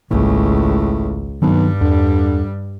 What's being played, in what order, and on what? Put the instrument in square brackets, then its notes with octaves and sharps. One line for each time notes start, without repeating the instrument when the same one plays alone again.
[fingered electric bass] G#1 A#3 [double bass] C#2 [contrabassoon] A2
[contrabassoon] B1 [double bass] G2 G3 [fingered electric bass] D#3 F#3 C4
[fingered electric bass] E2 [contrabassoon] D3